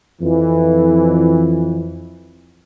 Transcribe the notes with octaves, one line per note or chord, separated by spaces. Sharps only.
F2 E3